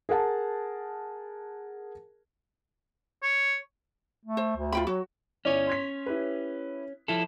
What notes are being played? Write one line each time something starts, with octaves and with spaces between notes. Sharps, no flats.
G#4 A#4 F#5 A5
C#5
A3
C5
D2
F4 G5 B5
F#3 F#4
G1 C#4 E4 C#5 D5
C6 G#6 B6
E4 G4 B4
F3 E4 A4